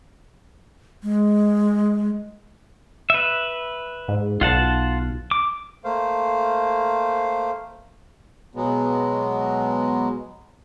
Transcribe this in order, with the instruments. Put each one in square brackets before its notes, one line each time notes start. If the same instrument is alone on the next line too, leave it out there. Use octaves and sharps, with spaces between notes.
[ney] G#3
[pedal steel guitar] B4 E5
[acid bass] G#2
[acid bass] B1 [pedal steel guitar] F4 F#5 A5
[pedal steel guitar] D6
[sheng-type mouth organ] A3 A#3 C5 F5
[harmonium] B2 F#3 G#3 B3